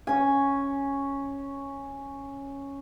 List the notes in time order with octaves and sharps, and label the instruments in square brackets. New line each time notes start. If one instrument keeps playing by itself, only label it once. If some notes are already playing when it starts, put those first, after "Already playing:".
[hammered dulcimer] C#4 G#5